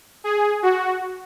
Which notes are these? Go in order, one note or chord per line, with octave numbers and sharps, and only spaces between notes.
G#4
F#4